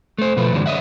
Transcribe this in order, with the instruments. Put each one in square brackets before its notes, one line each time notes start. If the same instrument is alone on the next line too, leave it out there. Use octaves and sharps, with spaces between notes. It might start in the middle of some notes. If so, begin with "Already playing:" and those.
[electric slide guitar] A3 C5
B2 F3 A3 B4
G2 D3 E3 F#3 G#3
C#5 D#5 E5 F#5